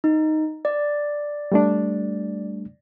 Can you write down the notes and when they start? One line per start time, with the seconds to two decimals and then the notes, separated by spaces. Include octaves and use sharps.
0.04 D#4
0.65 D5
1.52 G3 A3 D4